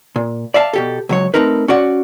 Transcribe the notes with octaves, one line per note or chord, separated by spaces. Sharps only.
A#2
D5 E5 F5 A5
B2 G4 A4
C#2 F#3 C#5
A3 B3 C4 D#4 A#4 B4
C#4 F#4 D5 F#5